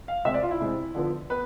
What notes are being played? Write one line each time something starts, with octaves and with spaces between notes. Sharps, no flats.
F5
C3 G#3 C4 E5
D5
F4
E4
C3 G#3 C4
D3 F3 B3
B3 B4